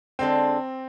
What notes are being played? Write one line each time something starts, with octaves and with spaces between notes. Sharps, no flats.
D3 G#3 C4 D4 A4